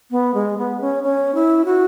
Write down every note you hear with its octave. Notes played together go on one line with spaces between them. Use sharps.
B3
G#3
B3
C#4
C#4
E4
F#4